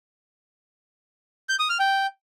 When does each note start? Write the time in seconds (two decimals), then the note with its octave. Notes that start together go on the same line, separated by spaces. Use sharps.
1.49 G6
1.59 D#6
1.69 F6
1.80 G5